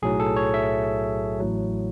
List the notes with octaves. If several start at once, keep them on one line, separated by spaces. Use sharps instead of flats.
B1 A2 F#3 G#4
A4
C#5
E5
A1 A2 F#3